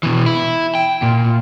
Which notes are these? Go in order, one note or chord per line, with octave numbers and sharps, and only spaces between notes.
B2 E3
E4
G5
A#2